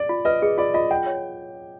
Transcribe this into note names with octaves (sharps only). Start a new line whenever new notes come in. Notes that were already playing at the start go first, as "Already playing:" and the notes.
Already playing: D5
F4
B4 D#5
G#4 D#5
F4 D5
F4 D#5
F#5 G5
C#5